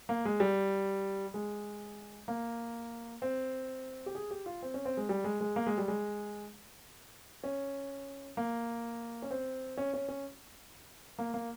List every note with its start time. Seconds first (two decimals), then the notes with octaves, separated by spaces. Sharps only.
0.09 A#3
0.25 G#3
0.40 G3
1.34 G#3
2.28 A#3
3.22 C4
4.06 G4
4.15 G#4
4.31 G4
4.46 F4
4.63 C4
4.74 C#4
4.85 C4
4.97 G#3
5.09 G3
5.24 G#3
5.41 G#3
5.56 A#3
5.67 G#3
5.78 G3
5.88 G#3
7.44 C#4
8.37 A#3
9.22 C#4
9.31 C4
9.77 C#4
9.94 C#4
10.09 C#4
11.19 A#3
11.34 A#3